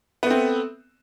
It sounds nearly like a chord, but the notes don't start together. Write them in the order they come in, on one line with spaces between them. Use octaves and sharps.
B3 A3 C4